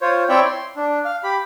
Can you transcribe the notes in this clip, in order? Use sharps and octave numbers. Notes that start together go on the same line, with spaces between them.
F4 C5 C#5
C4 E4 C#5 D5 E5 G5
C6
D4
F5
G4 B5